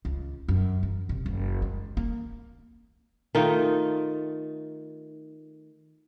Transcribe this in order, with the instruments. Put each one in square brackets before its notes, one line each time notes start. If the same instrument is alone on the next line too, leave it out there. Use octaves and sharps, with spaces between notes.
[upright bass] C#2
F#2
E3
C3
F#1
G#3
A#3
[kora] D#3 A3 D#4 F4